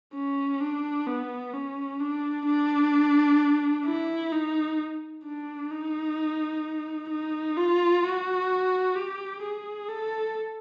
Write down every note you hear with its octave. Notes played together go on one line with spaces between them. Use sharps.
C#4
D4
B3
C#4
D4
D4
E4
D#4
D4
D#4
D#4
F4
F#4
G4
G#4
A4